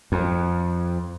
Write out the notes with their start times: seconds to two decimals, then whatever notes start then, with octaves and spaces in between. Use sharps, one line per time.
0.12 F2